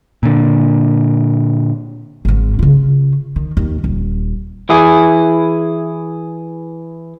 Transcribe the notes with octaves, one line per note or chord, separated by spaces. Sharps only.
A#2 D3
G#1 G#2
C#3 F4
D#3
D#2
D#1
E3 E4 G#4